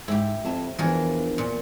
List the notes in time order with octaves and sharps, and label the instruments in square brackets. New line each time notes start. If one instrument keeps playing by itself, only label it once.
[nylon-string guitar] G#2 [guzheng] E4 G4
[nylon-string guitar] F2 E5 A5
[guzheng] E2 A#4 [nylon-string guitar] F3 D4
[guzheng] A#2